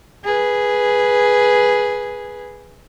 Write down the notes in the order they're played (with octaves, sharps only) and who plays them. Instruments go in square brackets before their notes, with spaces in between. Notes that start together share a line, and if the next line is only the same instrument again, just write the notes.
[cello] G#4 B4